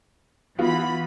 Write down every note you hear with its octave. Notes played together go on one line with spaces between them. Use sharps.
E3 B3 F4 F#4 B5